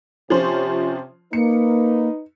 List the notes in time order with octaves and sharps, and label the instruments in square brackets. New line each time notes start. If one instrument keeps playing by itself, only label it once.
[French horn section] C3 [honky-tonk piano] F3 C#4 C5
[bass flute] A#3 [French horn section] D#4 B4 [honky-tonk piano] C#7